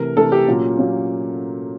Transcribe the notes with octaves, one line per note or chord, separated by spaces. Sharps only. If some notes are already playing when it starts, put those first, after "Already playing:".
Already playing: C3 E3 A3 A#4
C3 E3 A3 A4
G4
A#2 F#3 A#3 C#4
A#2 F#3 A#3 C#4